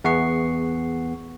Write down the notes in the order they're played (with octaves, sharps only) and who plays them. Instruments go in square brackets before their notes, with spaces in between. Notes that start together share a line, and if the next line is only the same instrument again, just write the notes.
[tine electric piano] E2 B3 G#4 F#5 C#6 C7